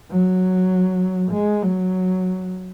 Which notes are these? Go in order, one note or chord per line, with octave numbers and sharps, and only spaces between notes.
F#3
G#3
F#3